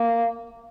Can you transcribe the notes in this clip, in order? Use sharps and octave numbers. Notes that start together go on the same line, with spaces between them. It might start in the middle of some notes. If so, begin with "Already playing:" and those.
Already playing: A#3